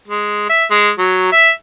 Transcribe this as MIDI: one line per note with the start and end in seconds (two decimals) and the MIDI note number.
0.08 0.48 56
0.49 0.65 76
0.70 0.90 56
0.98 1.32 54
1.32 1.51 76